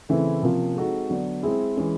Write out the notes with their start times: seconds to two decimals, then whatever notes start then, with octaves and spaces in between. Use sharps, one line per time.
0.09 C#3 E3 A3 C4 E4
0.43 C3 F3 A#3 C#4 F4
0.76 G#3 C4 D#4 F#4 A4
1.10 D3 F#3 B3 D4
1.43 G#3 C4 E4 G#4
1.77 E3 G#3 C#4